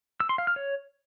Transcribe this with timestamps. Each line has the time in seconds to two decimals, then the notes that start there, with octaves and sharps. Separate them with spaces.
0.20 E6
0.29 C6
0.38 F5
0.47 F6
0.56 C#5